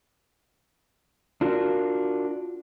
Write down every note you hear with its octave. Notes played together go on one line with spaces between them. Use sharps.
D4 F4 F#4 A#4